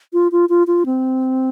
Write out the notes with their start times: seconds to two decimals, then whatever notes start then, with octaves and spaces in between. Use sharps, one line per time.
0.13 F4
0.32 F4
0.49 F4
0.67 F4
0.86 C4